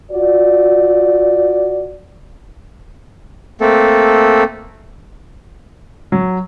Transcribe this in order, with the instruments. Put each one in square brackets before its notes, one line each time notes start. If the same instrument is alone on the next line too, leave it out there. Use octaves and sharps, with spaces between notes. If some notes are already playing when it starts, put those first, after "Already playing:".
[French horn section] F4 F#4 D5
[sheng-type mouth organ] A3 A#3 C4 A4
[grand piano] F#3